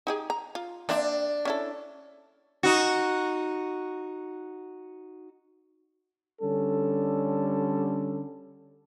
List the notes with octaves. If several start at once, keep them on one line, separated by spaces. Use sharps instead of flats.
D#4 G4 G#4
A#5
F4
A#3 C4 D4 E5
C#4 E4 A4
D#4 F#4
D3 G3 C#4 A4